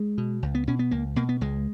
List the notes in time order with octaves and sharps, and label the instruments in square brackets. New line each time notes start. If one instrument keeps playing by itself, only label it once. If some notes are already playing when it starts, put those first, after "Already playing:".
Already playing: [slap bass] G#3
B2
C#2
B3
B2 C#4
B3
C#2 A#3
B2 A#3
B3
C#2 G#3